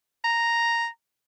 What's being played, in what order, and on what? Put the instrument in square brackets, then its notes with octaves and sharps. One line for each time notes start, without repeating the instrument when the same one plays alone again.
[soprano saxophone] A#5